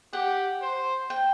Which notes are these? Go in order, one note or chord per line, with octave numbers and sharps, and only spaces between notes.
G4 F#5
C5
G5